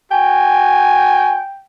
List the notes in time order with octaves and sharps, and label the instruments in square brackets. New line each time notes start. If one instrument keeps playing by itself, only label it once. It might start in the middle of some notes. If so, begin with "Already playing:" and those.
[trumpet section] F#4 G#5 [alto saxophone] G5